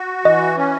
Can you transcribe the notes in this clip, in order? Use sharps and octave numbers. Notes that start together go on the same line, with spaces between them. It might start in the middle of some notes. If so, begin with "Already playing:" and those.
Already playing: F#4
E3 D#5
C#4